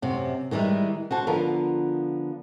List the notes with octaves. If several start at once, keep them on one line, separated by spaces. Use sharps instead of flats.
F#2 C3
D#3 E3 G3 G#3 E4
F#4 C5 A5
D3 F3 B3 F4 A#4